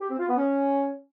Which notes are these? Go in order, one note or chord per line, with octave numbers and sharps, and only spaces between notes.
G4
C4
F4
B3
C#4